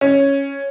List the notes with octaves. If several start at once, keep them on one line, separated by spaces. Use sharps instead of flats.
C#4